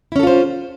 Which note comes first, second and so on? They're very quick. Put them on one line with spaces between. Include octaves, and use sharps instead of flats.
E4 C#4 A4 F4 C5